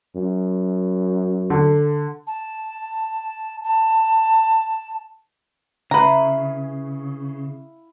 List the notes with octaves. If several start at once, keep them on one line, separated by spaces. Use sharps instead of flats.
F#2
D3
A5
A5
C#3 E4 B4 F5 A#5